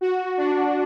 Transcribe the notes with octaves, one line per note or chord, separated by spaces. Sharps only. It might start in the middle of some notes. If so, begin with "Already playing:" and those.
F#4
D4